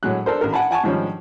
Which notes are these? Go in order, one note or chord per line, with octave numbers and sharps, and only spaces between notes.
A2 F#3 G#3 F#6
D4 A4 A#4 C5
A1 A#4
F#5 G#5 A5 B5
F#5 G#5 A5 C#6
G#2 D#3 F3 G3 C#4